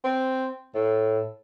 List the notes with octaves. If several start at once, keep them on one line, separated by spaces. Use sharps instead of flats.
C4
A2